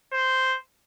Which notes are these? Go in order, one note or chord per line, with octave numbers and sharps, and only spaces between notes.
C5